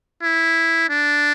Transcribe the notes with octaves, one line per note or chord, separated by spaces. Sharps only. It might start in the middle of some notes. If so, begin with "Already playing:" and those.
E4
D4